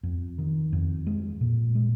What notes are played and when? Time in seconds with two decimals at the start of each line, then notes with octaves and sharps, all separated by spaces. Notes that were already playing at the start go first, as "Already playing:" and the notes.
0.03 F2
0.38 D#3
0.73 F2
1.07 G#3
1.41 A#2
1.75 G#3